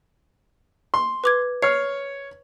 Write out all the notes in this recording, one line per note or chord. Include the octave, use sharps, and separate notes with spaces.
C6
B4 D6 G#6
C#5 F6 C7